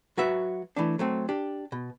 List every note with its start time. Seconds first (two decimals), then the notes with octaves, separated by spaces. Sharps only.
0.17 F#3 F#4 B4 E5
0.76 E3 A3 D4
0.99 F#3 A3 C4
1.29 D4 G4
1.72 B2